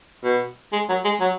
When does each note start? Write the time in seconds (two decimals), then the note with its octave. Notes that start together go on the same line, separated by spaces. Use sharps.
0.24 B2
0.73 G#3
0.89 F#3
1.05 G#3
1.20 F#3